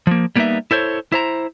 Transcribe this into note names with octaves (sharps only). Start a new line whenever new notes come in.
F3 A#3
G3 A#3 B3 D4 D#4 E5
E4 A4 C5 C#5
E4 C5 A#5